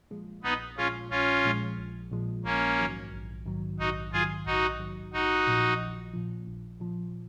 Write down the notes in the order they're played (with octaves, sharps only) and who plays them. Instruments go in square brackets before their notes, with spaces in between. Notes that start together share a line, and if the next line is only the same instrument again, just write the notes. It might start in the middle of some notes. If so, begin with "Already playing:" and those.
[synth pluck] A#2 F3 G#3
[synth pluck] A#1 [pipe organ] B3 D#4
[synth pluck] A#2 F3 G#3 [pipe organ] C#4 F4
[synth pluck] A#1 [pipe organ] C#4 F4
[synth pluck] A#2 F3 G#3
A#1
A#2 F3 G#3
[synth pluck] A#1 [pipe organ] A#3 C#4
[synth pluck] G#2 D#3 F#3
A#1
G#2 D#3 F#3
[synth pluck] A#1 [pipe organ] D#4 F#4
[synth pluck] G#2 D#3 F#3 [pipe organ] F4 G#4
[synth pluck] A#1 [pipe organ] D#4 F#4
[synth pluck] G#2 D#3 F#3
[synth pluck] A#1 [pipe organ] D#4 F#4
[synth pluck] A#2 F3
A#1
A#2 F3
A#1
A#2 F3